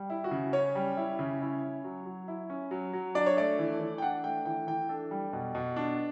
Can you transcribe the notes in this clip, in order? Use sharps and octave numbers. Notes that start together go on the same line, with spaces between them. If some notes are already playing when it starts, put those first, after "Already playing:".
Already playing: G3
E4
F#4
C#3
C#4 C#5
G3
E4
C#3
E4
C#4
F#3
F#3
E4
C#4
F#3
F#3
D4 D5
C#5
A3 D5
E3
E3
G5
D4 F#5
A3 G5
E3 G5
E3 G5
D4 A4
G3
B2
B2
D4